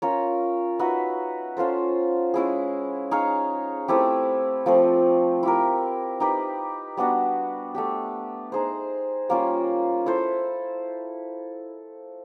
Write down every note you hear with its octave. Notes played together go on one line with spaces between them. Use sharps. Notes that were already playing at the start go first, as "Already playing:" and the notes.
C#4 F4 A#4 C#5
D#4 F#4 B4 E5
C#4 F4 A4 C5
G#3 C#4 E4 G#4
D#4 G#4 C#5 F5
A3 C4 E4 G4
F3 A3 C4
E4 G4 A#4
D#4 G4 B4
G3 B3 D4 F#4
A3 D4 G4
D#4 G#4 C5
G3 A#3 C#4 F4
E4 A4 C5